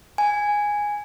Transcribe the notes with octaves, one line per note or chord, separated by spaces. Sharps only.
G#5